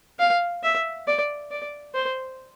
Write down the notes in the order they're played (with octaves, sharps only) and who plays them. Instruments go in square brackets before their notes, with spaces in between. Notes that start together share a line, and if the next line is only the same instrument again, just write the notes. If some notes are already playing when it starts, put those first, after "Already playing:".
[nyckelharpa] F5
E5
D5
D5
C5